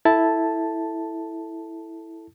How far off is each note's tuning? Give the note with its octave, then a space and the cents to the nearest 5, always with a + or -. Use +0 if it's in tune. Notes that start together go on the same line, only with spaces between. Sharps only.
E4 -5 A4 +0 A5 +0